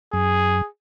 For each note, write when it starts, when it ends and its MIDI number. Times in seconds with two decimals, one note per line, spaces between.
0.13 0.62 42
0.13 0.68 68